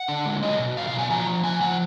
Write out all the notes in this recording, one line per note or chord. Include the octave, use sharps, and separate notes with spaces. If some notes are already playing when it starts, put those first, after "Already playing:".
Already playing: F#5
D3
G#3
F#3 D#5
B2
F#3 F5
F5
B2
G#5
F3 A#5
F3
F3 G#5
F3 F#5